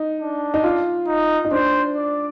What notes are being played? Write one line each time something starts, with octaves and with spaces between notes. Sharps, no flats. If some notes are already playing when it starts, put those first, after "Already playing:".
Already playing: D#4
D4
D#4
F4
D#4
D#4
D4 C5
D5